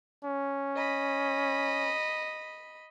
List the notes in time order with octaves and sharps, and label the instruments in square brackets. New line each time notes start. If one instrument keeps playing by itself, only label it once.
[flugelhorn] C#4
[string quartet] D#5 B5